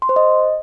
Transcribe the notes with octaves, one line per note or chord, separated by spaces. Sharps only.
C6
C5
D#5